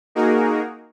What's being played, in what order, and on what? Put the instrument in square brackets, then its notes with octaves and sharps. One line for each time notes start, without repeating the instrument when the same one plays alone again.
[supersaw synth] A#3 D#4 F#4 G#4 A#4